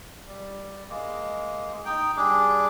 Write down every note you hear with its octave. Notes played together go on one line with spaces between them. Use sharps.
G3
G#3 A#3
D#4 G5
G3 D4 G#4 D6